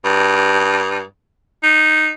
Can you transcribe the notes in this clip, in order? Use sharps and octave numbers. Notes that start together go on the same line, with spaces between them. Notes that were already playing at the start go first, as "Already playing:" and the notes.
G2
D#4